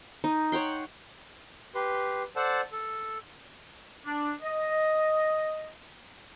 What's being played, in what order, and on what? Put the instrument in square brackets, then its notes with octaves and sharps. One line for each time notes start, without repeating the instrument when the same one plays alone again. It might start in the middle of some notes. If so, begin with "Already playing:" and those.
[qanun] D#4
C#5 F#5 G5 C6
[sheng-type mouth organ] G4 B4 C6
A4 C5 D5 F#5 A5
A4
[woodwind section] D4
D#5